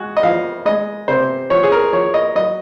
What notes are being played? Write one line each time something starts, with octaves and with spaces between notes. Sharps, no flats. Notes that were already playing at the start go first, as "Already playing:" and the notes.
Already playing: G#3 F#4
D#5
F3 F5
G#3 D#5
C3 C5
F3 C#5
G#4
A#4
F3 C#5
D#5
F#3 D#5